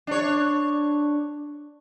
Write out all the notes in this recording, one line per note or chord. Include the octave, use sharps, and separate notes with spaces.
D4 C#5